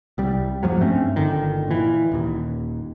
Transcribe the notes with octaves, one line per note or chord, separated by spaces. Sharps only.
C2 G3
E2 G#2 F3 F#3
G2 A3 C4 C#4
G1 D3 D#3
A#2 E3
D#1 D#2